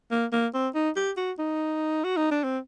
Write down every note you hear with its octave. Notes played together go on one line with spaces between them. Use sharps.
A#3
A#3
C4
D#4
G4
F#4
D#4
F#4
D#4
D4
C4